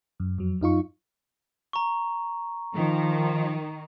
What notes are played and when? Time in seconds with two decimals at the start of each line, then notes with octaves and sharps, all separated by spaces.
0.20 F#2
0.38 F2 F#3
0.61 F#2 D#4 F4 C#6
1.73 A#5 C#6
2.74 D#3 F3